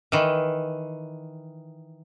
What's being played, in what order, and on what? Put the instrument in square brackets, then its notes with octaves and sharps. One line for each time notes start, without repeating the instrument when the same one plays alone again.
[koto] D#3 E3